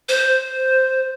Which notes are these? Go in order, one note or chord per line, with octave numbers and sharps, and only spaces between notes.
C5